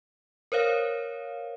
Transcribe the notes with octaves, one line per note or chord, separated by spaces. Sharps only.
A#4 C5 C#5 F5